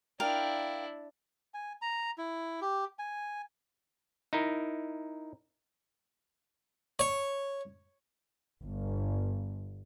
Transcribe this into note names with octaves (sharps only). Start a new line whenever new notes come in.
D4 E4 A#4 F5 G5
G#5
A#5
E4
G4
G#5
D#4 E4 A#4
C#5
G1